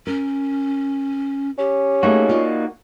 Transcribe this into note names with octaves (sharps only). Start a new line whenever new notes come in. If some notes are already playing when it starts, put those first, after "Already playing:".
C#4 A#4
C#4 G4
A3 A#3 D#4 F#4 G#4
F4 D5 D#5